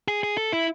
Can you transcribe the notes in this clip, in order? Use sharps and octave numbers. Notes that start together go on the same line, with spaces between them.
G#4
G#4
A4
E4